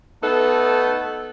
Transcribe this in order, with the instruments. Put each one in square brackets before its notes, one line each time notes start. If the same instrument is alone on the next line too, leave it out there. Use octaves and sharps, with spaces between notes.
[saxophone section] A3 B3 D#4 A4